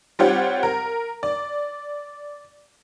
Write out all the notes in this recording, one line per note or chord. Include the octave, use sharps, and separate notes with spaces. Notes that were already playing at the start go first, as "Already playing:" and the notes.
G3 C4 F4 G4 C#5 F#5
A#4
D5